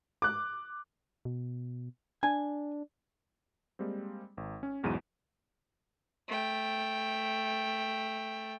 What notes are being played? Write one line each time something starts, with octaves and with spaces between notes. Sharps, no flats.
D6 F#6
B2
D4 G#5
G3 G#3 A#3 C4
G#1
C#4
B1 E2 G#2 F#3 E4 D#7
A3 G5